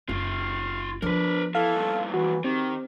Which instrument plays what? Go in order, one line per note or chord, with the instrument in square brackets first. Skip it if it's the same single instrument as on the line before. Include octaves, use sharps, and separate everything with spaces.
[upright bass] F#1 [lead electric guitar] F4 G4
[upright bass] F3 B3 [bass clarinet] D4 [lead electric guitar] A#4 B4
[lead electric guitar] E3 [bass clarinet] A4 [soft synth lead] F5
[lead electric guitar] G2 A#2
[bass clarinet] E3 [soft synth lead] F#4
[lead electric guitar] D#3 [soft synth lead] C4 [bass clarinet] G4